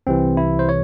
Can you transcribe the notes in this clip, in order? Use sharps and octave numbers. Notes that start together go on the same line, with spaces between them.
C2 C3 E3 C4
E4
C5
C#5